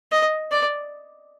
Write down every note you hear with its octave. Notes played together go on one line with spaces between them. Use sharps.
D#5
D5